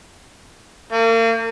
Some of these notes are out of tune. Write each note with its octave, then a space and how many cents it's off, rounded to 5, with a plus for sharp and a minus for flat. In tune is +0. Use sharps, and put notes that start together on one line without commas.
A#3 -40